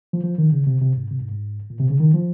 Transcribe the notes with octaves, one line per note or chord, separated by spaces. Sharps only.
F3
F3
D#3
C#3
C3
C3
G#2
C3
G#2
G#2
A#2
C3
C#3
D#3
F3